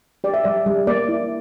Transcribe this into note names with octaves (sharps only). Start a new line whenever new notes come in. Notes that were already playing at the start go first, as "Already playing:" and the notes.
G4 D5
E5
G3 D5
G3
A#3 D5
E4